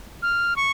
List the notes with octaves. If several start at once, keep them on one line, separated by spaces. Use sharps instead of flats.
F6
C#6